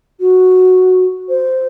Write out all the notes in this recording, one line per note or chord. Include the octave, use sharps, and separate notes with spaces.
F#4
C5